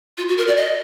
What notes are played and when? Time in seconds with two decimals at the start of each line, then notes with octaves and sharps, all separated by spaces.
0.18 F4
0.28 F#4
0.38 A#4
0.47 D5
0.57 D#5